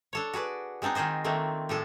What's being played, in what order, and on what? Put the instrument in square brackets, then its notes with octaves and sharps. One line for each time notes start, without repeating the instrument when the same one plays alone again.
[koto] D4 A4 C#5
F#4 G#4 B4 D5
G#3 C4 D4 D#4 G#4
D#3 F4 G#4 C5 D#5
D#3 A3 A#3 C4 D4
A2 F3 D4 G#4 A4